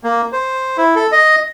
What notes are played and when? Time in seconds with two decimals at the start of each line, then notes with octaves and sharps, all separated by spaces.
0.04 A#3
0.33 C5
0.78 E4
0.96 A4
1.12 D#5